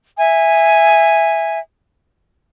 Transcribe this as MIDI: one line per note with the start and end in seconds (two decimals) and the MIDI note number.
0.18 1.59 76
0.18 1.59 80